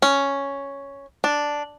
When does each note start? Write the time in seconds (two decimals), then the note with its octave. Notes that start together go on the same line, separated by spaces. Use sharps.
0.02 C#4
1.24 D4